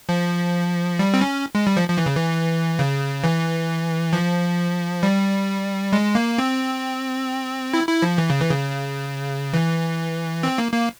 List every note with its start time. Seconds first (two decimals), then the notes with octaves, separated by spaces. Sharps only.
0.09 F3
0.99 G3
1.14 C4
1.21 C#4
1.55 G#3
1.67 G3
1.77 F3
1.89 F3
1.98 E3
2.06 C#3
2.16 E3
2.79 C#3
3.24 E3
4.13 F3
5.03 G3
5.93 G#3
6.15 A#3
6.38 C4
7.74 E4
7.88 E4
8.02 F3
8.18 E3
8.30 C#3
8.41 E3
8.51 C#3
9.53 E3
10.43 C4
10.58 A#3
10.72 A#3